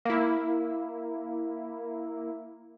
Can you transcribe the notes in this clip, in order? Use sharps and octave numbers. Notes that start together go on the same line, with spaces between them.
A#3 E4